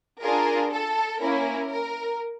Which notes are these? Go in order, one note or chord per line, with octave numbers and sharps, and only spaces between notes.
D4 F4 G#4 A#4
A4
A#3 C#4 E4 A#4
A#4